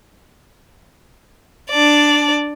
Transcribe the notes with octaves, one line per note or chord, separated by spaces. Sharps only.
D4 D5